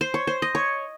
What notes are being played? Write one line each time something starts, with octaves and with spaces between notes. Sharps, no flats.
C5
C#5
C5
D#5
C#5